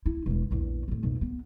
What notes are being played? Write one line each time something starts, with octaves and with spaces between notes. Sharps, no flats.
E4
E1 G#3
A#1 E2
A2 C4
B1 F2
B3